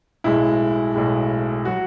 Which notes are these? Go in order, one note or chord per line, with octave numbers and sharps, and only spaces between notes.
B1 A2 G#3 E4
B1 A2 G#3
F#3 F#4